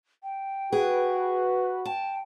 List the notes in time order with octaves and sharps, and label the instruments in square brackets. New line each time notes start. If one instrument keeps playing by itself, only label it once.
[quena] G5
[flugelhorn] F#4 [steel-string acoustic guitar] G#4 [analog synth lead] B4
[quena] G5 [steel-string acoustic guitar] A5